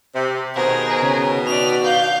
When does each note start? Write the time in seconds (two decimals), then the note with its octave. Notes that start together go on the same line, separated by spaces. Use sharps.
0.14 C3
0.55 B2 D#3 G#4 A#4 C5
1.01 C#3
1.47 F#4 D5 F7
1.85 F5 G6